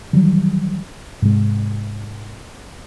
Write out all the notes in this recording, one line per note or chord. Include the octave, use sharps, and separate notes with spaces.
D#3 E3 F#3 G3
G#2 C3 G#3